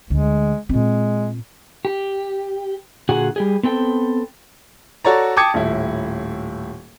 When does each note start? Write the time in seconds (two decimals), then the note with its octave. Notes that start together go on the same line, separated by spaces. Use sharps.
0.10 D2 G#3
0.69 A#2 G#3 C4
1.85 G4
3.09 A#2 D3 F#4 G#4 F#5 G#5
3.36 G3 G4 G#4
3.63 B3 C4 A4 G5
5.05 F#4 A4 C#5 D5 A#5
5.37 G5 A5 D6 D#6 G#6 C#7
5.54 D#1 A2 E4